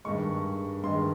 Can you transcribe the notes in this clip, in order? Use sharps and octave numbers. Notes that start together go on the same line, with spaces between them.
G2 D#3 G#3 C#6
G2 D#3 G#3 C6